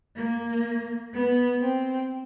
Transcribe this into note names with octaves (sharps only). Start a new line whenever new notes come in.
A#3
B3
C4